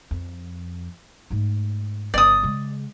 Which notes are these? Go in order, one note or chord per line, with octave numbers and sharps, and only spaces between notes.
F2
G#2 A3
G1 C#3 D5 D#6
C#3 G#3